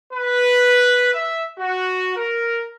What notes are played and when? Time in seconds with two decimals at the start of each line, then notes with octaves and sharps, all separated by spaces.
0.12 B4
1.13 E5
1.58 F#4
2.16 A#4